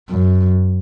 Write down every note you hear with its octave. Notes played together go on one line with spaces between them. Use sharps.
F#2